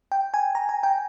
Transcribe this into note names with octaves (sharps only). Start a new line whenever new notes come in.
G5
G#5
A#5
G#5
G5